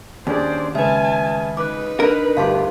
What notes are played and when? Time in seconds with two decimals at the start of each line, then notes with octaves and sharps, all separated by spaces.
0.27 D#2 C#4 D4 G#4 C5 D5
0.75 C#3 G#3 B4 E5 G#5 A5
1.57 D#4 B4 D6 F#6
2.00 D4 A#4
2.37 G1 D2 G4 F5 A5 C6